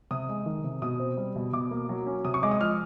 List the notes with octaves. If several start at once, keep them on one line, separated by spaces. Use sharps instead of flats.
C3 D#6
G#3
D#3
C3
B2 D#6
C4
G3
B2
B2 D6
A#3
F#3
C#4
C3 D#6
C#6
G#3 D6
D#6
F3 F6